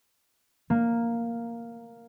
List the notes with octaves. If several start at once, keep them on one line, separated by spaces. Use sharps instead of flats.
A#3